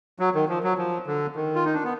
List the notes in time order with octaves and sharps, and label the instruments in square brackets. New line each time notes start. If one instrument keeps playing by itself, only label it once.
[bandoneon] F#3
D#3
F3
F#3
F3
D3
D#3
F4
D#4
D4
B3